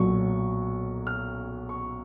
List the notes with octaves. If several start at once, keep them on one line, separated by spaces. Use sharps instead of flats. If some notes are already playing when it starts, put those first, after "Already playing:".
Already playing: B1 A#2 F#3 C#6
F6
C#6